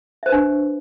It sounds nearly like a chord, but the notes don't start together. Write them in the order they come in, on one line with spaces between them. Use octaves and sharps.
E5 C5 B4 D4